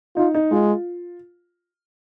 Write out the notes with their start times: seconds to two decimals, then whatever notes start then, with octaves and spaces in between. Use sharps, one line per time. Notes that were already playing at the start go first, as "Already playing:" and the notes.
0.16 D#4 F4
0.34 D#4
0.51 G#3 F4